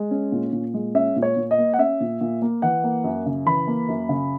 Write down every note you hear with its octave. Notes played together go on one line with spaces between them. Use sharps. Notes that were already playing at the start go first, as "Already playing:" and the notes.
Already playing: G#3
C#4
A#2
A#2
G#3
C#4 E5
A#2
C#5
A#2
D#5
A#3
F#5
C#4 E5
A#2
A#2
A#3
E3 F#5
A#3
F#2
C#3
E3 B5
A#3
F#2
C#3